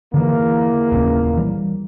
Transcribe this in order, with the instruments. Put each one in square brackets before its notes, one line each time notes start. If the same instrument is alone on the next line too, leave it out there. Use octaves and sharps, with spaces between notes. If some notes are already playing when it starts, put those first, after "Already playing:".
[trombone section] E2 A#3 [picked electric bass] D3 E3
[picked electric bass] D#1 C#2 C#4
E3 G3